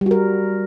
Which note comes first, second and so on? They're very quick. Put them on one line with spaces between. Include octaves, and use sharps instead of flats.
G3 F#4 A#4